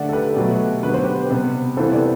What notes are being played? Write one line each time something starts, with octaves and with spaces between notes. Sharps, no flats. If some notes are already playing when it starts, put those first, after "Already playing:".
Already playing: D3 A3 D5 F#5
A4
G4 B4
B2 F#3 A3
D3 F#3 B3 B4
C5
G4 B4
C3 G3 B3
C3 E3 B3 A4 C5
B4 D5